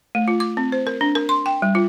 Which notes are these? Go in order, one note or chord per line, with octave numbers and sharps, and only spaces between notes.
A3
F4
D6
C4
C5
A#4
D4
A#4
C6
G5
G3
F4